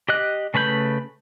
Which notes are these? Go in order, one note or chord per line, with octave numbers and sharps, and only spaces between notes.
G4 D#5 F#6
C#3 A3 B4 B5 G6